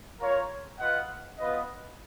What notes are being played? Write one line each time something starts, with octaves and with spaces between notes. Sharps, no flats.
F4 A#4 C#5
F4 B4 D#5 F#5
B3 F4 B4 D#5